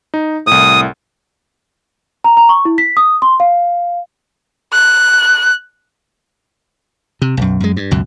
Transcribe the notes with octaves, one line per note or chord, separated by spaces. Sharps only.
D#4
C2 A2 D#6
A#5
A#5
C#6
E4
B6
D#6
C6
F5
F#6
C3
B1 F#2
F#2 G#3
G2
C#2 F#2 B2